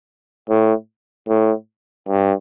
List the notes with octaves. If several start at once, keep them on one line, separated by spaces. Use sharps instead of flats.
A2
A2
G2